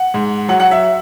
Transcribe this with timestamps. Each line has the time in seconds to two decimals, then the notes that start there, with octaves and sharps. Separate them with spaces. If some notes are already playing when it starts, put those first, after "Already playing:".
Already playing: F#5
0.14 G#2
0.48 F#3 F#5
0.60 F#5
0.71 E5